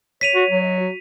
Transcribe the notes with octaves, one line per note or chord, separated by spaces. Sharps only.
C#5 B6 D#7 F7
F#4
F#3
D#5
F#4